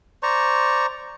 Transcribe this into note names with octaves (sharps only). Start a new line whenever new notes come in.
C5 D5 A#5 C#6